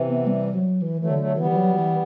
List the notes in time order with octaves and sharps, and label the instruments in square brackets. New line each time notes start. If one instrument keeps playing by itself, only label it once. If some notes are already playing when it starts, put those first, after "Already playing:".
Already playing: [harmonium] C3 E3
[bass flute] B3
G3
F#3
E3
[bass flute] E3 [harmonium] F#3 A3
[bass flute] D3
[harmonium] F#3 A3
[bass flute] E3 [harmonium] G3 B3
[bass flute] E3
F#3
E3